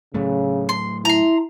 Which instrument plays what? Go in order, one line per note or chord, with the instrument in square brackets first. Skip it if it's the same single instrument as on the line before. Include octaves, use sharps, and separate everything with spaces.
[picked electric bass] A2 F#3 A3 [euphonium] C#3
[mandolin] C6
[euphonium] E4 [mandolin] A#5 C6